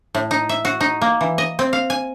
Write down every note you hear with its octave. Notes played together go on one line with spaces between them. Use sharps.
A2
D#4
E5
F#4
D#4
A#3
E3
D#5
C4
F5
G#5